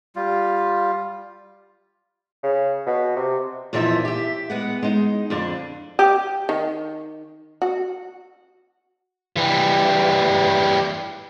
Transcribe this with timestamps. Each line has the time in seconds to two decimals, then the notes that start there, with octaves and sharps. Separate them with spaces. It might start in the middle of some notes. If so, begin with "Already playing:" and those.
0.16 G3 F4
2.43 C#3
2.86 B2
3.16 C3
3.73 E2 A#2 E3 F3 D#4 E5
4.05 G4 E5
4.50 G#3 B3 F#5
4.83 G#3 D#4
5.30 F2 D3 D4
5.99 G4
6.49 D#3
7.62 F#4
9.37 E3 G3